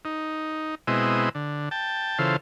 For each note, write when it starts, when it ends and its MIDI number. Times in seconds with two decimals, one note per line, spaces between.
0.05 0.75 63
0.87 1.29 47
0.87 1.29 56
0.87 1.29 60
0.87 1.29 64
0.87 1.29 75
1.35 1.69 50
1.71 2.18 79
1.71 2.18 81
2.19 2.36 49
2.19 2.36 52
2.19 2.36 65
2.19 2.36 69
2.19 2.36 72